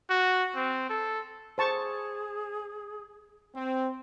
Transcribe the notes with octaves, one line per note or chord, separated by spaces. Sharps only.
F#4
C4
A4
G#4 C5 A5 C#6
C4